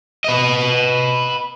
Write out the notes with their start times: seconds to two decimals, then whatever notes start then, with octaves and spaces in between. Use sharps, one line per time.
0.24 B4 D#5